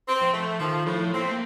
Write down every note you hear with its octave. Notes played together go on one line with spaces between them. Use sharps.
C4
F3
A3
D#3 F3
A2 F3
A#3 C4
A3
A#3